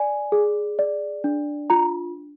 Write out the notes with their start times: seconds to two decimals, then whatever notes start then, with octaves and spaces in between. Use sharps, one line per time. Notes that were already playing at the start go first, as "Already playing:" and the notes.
Already playing: D5 G#5
0.32 G#4
0.79 D5
1.24 D4
1.70 F4 A#5